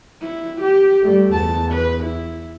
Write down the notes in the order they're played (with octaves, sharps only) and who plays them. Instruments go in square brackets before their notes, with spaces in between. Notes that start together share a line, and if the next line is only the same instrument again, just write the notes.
[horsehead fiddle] E4
G4
[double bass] G3 A3
[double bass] E2 [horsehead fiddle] A5
[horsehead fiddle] B4
E4